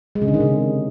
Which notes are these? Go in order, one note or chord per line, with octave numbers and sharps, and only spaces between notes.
G#3
C#3
D3
D#3
C3